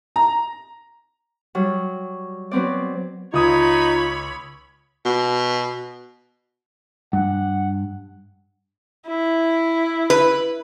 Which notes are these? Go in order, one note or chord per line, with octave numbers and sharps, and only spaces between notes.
A#5
F#3 G3
F#3 B3 C4 D5
C#2 D#4 F4 C#5 B5 D#6 G#6
B2
G2 F#5
E4
B4